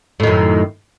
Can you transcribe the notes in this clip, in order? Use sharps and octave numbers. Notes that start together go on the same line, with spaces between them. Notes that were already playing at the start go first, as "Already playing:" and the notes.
F#2 A2 D#3